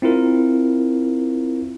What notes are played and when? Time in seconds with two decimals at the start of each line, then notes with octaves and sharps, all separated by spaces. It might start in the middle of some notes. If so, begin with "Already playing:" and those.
0.02 C4 E4 F4 A#4